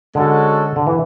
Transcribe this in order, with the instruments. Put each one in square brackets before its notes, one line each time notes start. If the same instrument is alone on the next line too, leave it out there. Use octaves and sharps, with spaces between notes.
[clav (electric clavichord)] D3 [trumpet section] G#3 C#4 F#4 A4
[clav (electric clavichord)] D3
E3